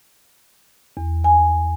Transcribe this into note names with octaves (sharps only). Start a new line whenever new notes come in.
E2
G#5